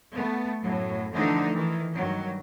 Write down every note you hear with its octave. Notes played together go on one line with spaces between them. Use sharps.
A3 B3
F#2 A2 F#3
D3 E3 F3 A3 D4 D#4
D#3 E3
G2 D#3 F#3